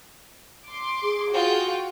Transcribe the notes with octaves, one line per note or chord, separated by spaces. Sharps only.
C6 D6
G#4
F4 F#4 G5